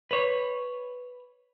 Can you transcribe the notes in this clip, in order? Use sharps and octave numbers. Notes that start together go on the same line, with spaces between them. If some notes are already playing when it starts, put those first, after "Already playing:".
B4 C#5